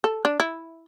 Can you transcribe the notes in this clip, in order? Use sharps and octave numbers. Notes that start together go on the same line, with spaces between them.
A4
D4
E4